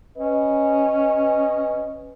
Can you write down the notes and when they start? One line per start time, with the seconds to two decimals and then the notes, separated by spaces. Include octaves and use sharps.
0.18 C#4 B4 D#5